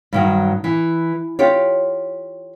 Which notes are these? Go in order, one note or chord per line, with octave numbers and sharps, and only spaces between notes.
G2 D#3 F#3
E3
F4 G4 C#5